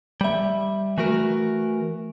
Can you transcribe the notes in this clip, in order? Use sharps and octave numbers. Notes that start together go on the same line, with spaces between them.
G3 E5
E3 A3 F#4 A#4